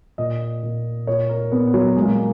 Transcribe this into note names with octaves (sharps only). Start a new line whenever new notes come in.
A#2 D#5
A#2
A#2 C#5
A#4
A#2 B3
F#3
A#2 G#3
A#3
G#3